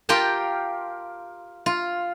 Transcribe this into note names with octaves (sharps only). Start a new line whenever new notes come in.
F4 G4 A#4 G5 A5
F4